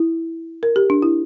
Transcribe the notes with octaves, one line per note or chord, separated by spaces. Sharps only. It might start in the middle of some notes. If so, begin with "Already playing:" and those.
Already playing: E4
A#4
G4
D4
E4